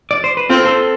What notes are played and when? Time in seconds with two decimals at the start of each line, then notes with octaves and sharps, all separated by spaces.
0.11 D5
0.24 C5
0.37 B4
0.50 C4 F4 A4
0.65 A4 C5